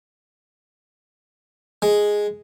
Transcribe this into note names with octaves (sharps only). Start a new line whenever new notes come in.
G#3